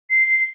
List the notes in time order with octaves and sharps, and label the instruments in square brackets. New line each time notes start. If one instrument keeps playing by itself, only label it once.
[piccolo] C7